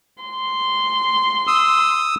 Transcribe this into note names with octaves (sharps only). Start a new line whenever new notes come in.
C6
D#6 E6